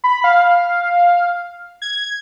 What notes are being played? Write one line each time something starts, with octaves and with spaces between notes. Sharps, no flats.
B5
F5
G#6